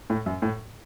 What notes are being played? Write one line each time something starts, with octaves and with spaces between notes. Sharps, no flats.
A2
F#2
A2